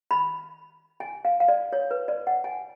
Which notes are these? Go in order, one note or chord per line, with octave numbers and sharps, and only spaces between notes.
B5
G#5
F5
F5
D5
C#5
B4
D5
F#5
G#5